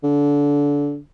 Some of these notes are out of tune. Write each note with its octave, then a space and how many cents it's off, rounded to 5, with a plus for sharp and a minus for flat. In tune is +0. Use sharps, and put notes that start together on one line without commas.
D3 -25